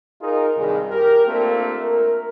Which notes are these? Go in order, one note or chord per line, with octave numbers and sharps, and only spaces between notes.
D#4 F4 G#4 A#4
G2 C3 D#3 G#3
G4 A#4
A3 A#3 C4 D4 F4
A#4